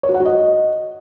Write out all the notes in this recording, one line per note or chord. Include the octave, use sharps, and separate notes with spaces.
C#5
F#4
F#5
F#4
D#5